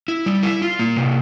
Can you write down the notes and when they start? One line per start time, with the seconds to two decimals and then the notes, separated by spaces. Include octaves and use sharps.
0.08 E4
0.26 G3
0.43 E4
0.62 F4
0.79 A#3
0.96 C3